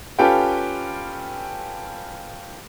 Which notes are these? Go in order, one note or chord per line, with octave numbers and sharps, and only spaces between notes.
C#4 F4 G4 A4 B4 G5